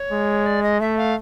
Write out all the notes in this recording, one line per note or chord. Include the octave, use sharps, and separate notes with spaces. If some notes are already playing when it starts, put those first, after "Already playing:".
Already playing: C#5
G#3
D5
D#5
A3 E5
F5